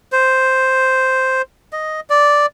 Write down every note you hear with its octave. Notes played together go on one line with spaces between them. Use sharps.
C5
D#5
D5